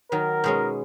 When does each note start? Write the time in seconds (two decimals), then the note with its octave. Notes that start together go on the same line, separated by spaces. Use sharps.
0.12 D#3 F#3 A#4
0.44 B2 G#3 C#4